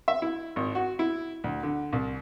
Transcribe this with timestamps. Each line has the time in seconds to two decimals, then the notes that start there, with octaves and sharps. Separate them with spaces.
0.08 E5
0.22 E4
0.56 G#1
0.75 F#4
0.99 E4
1.44 D2
1.63 D3
1.93 C2